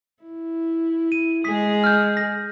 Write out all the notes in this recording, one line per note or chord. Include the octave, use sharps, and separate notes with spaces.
E4
D#7
G#3 G#4 D#6 B6
F6 G6
A#6